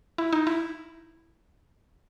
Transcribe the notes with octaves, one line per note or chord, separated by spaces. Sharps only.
E4
D#4
E4